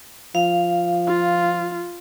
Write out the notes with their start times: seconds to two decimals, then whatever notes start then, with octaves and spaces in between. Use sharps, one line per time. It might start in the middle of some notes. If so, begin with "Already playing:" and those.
0.35 F3 F5
1.07 F4